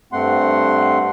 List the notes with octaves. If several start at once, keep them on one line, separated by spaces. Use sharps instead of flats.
G2 A3 C4 F#5 C6